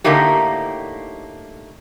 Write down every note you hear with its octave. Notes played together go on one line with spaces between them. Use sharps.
A2 D3 A3 A#3 D#4 G4